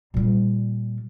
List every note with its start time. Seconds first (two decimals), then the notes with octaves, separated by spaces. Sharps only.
0.14 A#2 G3